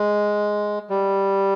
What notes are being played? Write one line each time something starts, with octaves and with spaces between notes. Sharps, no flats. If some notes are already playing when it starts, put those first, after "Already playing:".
Already playing: G#3
G3